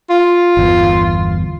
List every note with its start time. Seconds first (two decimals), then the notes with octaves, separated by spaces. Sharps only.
0.10 F4
0.57 G1 E2